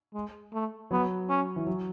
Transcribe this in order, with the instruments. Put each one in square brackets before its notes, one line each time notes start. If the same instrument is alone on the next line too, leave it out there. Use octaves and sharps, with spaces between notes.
[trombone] G#3
A3
[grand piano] F#3 [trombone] B3
[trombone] C#4
[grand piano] E3
F#3